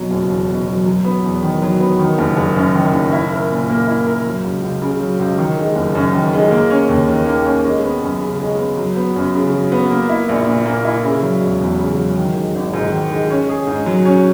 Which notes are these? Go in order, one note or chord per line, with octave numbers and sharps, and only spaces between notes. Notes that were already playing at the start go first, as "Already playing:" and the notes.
Already playing: B2 F#3
F#1
E2
B2
F#3
F#3
B3
E2
D#3
F#3
B3
D#3
F#1
F#1
F#2
D#3
F#1
E4
A#4
A#2
A#3
E4
A#4
F#3
C#2
C#2
C#3
F#3
C#2
D#3
G#3
F#1
F#2
D#3
G#3
A#3
C#4
D#2
D#3
A#3
C#4
G#3
B3
F#2
C#3
G#3
B3
F#3
B3
F#2
C#3
F#3
B3
A#3
E4
A#1
A#2
A#3
E4
C#3
F#3
E1
E2
C#3
F#3
D#3
G#3
G#1
G#2
D#3
G#3
C#4
G#4
G#2
F#3
C#4